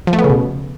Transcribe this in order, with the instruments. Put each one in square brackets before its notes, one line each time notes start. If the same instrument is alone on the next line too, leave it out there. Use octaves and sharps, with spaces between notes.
[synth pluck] F3
A3
B3
C#3
B2